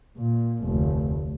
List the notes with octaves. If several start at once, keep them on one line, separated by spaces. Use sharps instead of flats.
A#2
F1 D2